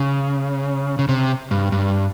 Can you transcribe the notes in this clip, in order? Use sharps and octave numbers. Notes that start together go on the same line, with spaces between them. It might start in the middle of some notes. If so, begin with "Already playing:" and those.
Already playing: C#3
C#3
C3
G2
G2